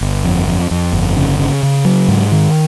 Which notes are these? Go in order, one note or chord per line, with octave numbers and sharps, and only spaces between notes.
G1
F2
F2
F2
G1
C#3
C#3
C#3
F#3
G#2
D#3